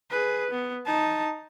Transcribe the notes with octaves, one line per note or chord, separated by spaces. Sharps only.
G#4 B4
B3
D#4 A5